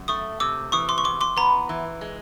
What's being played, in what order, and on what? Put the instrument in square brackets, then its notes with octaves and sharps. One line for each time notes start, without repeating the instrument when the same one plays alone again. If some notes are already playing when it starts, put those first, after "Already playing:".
Already playing: [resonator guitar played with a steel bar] F#2
[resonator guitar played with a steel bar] A3 [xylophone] C#6 D#6
[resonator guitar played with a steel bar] C3 [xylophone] D6 E6
[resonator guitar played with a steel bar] E3 [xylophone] C#6 D#6
[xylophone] C6 D6
C#6
[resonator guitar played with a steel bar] E2 [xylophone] C6 D6
[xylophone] C6 D6
[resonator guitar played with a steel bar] B3 [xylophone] A#5 C6
[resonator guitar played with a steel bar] E3
G#3